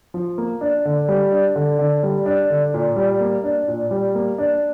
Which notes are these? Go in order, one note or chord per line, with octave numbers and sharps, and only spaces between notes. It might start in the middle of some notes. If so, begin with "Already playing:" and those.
F3
A#3
D4
D3
G3
D4
D3
D3
G3
D4
D3
A#2
G3
A#3
D4
A#2
G3
A#3
D4